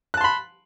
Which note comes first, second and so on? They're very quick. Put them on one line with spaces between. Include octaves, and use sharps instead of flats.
F#6 A5 C6 B5